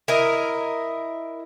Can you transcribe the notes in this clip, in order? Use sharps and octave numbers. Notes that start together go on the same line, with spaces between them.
E4 A#4 D#5